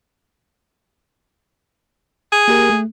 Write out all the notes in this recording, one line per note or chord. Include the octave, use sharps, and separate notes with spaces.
G#4
A#3 G4 A#4
A3